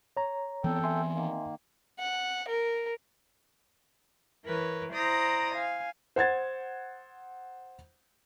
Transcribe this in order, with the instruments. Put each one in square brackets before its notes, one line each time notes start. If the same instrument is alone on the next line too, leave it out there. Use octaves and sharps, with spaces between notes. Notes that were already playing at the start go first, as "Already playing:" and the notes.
[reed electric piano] C#5 A#5
[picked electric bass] E3 B3 C4 [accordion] A4 G5
[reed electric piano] E5 G#5 C6
[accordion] D#3 A#3
[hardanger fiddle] F#5
A#4
[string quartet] E3 A#4 B4 C#5
E4 C5 D5 A#5 D#6 A#6
F5 G#5
[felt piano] C5 F#5 G#6 A6